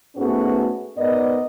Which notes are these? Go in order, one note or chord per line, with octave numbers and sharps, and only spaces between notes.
G#2 A3 B3 C#4 F#4 G#4
G#2 B3 A#4 D5 D#5